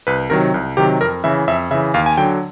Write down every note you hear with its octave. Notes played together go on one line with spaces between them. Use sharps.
C2 B4
C3 D#3 F#3 A#4
C2
C3 D#3 F#3 G4
F2 A#4
C#3 E3 E5
F2 E5
C#3 E3 E5
D#2 F5
G#5
D3 F#3 G5